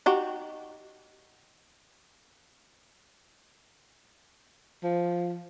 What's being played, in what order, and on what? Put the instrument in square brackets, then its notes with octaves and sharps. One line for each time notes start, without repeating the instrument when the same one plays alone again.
[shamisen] D#4 F#4 G4
[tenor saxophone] F3